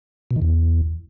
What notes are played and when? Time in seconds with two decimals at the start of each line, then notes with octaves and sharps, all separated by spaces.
0.31 B2
0.36 D#3
0.42 E2